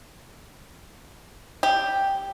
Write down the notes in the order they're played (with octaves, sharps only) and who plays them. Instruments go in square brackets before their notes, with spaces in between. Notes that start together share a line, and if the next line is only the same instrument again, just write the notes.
[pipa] G4